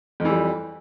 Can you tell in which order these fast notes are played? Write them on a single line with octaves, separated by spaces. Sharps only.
F2 E3 G3